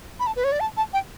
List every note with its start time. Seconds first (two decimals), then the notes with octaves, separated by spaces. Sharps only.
0.20 B5
0.27 A5
0.36 B4
0.44 C#5
0.52 D5
0.60 A5
0.77 A5
0.93 G5